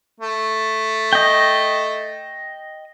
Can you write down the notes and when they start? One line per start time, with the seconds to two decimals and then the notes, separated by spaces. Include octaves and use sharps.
0.20 A3
1.13 D#5 G5